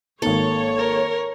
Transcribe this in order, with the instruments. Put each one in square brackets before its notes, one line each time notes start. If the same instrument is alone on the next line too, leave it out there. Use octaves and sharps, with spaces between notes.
[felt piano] G#1 A#3 D#4 [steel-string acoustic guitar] A4 [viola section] C#5
[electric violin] A#4